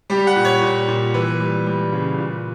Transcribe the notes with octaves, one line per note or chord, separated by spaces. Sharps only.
G3 G4
F#5
A#2
C#5
A#2
A#2
E3 B4
G3
G3
C#3
A#2